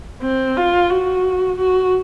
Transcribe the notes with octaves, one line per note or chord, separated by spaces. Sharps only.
C4
F4
F#4
F#4